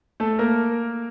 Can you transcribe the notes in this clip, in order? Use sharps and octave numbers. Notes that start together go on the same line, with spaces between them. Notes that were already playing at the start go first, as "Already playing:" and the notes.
A3 A4
A#3 A#4